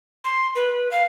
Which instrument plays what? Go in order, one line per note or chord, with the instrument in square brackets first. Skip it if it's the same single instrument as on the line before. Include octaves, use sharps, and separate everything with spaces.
[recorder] C6
B4
F5